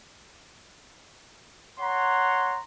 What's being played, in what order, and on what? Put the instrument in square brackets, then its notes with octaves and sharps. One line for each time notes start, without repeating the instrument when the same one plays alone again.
[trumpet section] C#5 F#5 A#5 C6